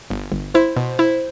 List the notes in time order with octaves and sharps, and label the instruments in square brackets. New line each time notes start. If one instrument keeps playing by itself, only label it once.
[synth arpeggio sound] G1
G1
[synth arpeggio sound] E4 [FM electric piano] C5
[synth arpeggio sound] B2
E4